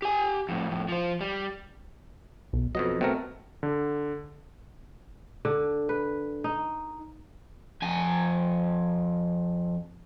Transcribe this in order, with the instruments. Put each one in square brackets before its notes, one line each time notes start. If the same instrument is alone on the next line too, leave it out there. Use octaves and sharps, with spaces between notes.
[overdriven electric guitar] G4 G#5
F2 A2
F2 A2
F3 C5
G3
[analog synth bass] B1
[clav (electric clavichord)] F2 B2 D#5 [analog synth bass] F#3
[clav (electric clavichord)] B2 A3 A#4 [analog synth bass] C4
[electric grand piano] D3
[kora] D3
B4
D#4
[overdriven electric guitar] F2 G#5